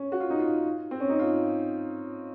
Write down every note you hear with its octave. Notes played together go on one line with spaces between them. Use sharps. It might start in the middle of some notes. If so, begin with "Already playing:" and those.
Already playing: C#4
F#4
F4
D#4
F4
C4
C#4
D#4
F4